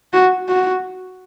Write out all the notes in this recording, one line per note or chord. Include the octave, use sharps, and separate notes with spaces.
F#4
F#4